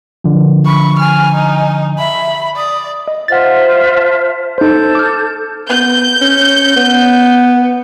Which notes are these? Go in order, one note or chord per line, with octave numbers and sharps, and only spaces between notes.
D3 F3
B5 C#6
G#5 F6
D#4
E5 B5
D5 D#6
D#5
F4 C5 E5 F#5 A6
A5
D#4 A4 C5 G6
D6 F6
B3 G6
C#4
B3